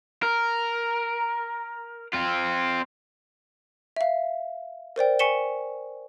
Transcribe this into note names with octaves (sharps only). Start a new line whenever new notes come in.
A#4
C4 F4
E5 F5
A#4 C5 D5 G5
G#5 C#6 B6 C#7 E7 G7